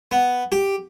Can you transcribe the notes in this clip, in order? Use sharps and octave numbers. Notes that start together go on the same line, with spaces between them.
B3
G4